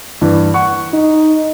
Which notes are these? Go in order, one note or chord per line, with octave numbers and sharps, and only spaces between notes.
G2 E3
F#5 C#6
D#4